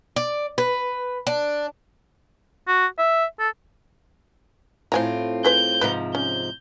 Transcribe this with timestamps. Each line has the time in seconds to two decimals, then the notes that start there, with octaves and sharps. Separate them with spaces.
0.16 D5
0.58 B4
1.27 D4
2.68 F#4
2.98 E5
3.40 A4
4.92 A2 C4 F4 C5 G#5 A#5
5.45 G#4 B4 C5 G6
5.81 G#2 C3 F3 B4
6.15 C#4 G6